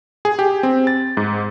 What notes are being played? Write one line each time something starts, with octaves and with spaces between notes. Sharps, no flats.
G#4
G4
C4
A6
G#2